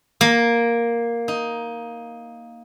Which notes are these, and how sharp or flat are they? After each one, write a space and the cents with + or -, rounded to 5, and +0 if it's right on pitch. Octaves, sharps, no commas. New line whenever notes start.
A#3 +5
D#4 +10